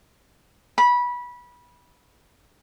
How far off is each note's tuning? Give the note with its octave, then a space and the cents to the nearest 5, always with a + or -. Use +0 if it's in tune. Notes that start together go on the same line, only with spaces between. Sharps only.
B5 -20